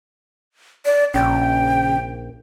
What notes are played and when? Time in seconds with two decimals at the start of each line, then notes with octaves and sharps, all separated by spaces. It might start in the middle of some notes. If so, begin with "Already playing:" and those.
0.85 D5
1.14 A#1 C#3 G5